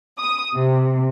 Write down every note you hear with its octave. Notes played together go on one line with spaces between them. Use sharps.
D#6
C3